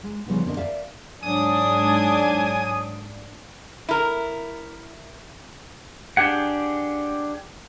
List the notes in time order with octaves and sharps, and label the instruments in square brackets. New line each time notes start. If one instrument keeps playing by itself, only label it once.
[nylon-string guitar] G#3
C#3 F3 G3 B3 D#4
E2 D3 C4 G#4 A#4 D#5
A#4 D5 E5 F5
[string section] G#2 D4 [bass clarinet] F#3 [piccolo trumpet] G#5 [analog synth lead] D#6
[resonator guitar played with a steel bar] E4 A#4
[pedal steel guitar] D4 G4 G#4 F#5